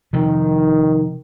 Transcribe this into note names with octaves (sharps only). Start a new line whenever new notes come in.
C3 D#3 F3